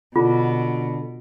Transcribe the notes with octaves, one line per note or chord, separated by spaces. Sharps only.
B2 D3 D4 F4